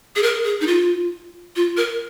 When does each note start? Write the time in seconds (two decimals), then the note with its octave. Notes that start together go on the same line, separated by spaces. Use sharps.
0.16 G#4
0.23 A#4
0.45 G#4
0.61 D#4
0.67 F4
1.56 F4
1.77 A#4